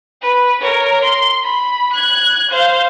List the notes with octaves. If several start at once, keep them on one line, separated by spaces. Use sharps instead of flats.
B4
A#4 C#5
C6
B5
F#6 G#6
C5 F5